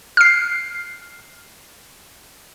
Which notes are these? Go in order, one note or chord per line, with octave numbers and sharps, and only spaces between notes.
F6 C7